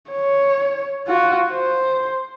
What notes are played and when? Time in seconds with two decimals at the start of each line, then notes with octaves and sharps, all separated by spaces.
0.11 C#5
1.08 F4 F#4
1.51 C5